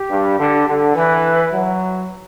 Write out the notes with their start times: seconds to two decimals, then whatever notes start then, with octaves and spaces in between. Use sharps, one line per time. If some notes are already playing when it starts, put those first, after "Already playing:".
Already playing: G4
0.09 G2
0.38 D3
0.67 D3
0.95 E3 B4
1.53 F#3